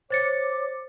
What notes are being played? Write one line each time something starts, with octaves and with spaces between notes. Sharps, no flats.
C5 C#5 D6 A6 C#7